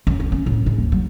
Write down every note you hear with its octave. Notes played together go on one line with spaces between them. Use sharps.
F#2
C#4
C#4
A2
G#2
D#2
F#3